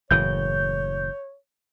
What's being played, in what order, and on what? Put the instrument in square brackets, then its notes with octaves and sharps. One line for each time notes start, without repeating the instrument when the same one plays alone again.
[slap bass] F#1 A2 E3 [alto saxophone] C#5 [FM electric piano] G6